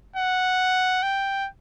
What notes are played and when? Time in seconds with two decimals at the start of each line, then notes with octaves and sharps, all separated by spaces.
0.16 F#5
1.03 G5